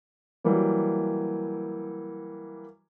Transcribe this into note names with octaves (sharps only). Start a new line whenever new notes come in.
E3 F#3 G3 A#3